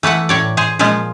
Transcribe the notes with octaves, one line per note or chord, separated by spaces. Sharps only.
E3 A3 B4 F#5
A2 C#5 D5
G#4 C5
A#2 F3 G#3 F4 C5